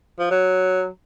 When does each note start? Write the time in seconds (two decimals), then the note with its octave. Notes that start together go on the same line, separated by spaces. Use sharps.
0.19 F3
0.31 F#3